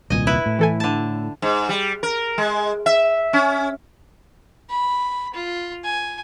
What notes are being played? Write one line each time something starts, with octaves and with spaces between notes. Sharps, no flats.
D#1 C2 A#2 D#5 G#5
E4 B4
A2
E3 A4 G#5
D3 A5
G#2
G3
A#4
G#3
E5
C#4
B5
F4
G#5